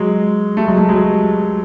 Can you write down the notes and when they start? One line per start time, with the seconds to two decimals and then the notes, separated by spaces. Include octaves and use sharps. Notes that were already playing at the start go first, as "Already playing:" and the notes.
Already playing: F#3 G#3
0.57 G3 A3
0.68 F#3 G#3
0.77 G3 A3
0.89 F#3 G#3